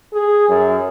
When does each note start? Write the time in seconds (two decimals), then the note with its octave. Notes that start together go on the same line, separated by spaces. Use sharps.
0.13 G#4
0.49 F#2